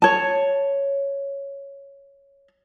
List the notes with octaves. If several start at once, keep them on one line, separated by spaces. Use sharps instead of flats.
C#5 A5